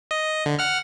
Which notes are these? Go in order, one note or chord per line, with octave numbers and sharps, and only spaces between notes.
D#5
D3
F#5 F6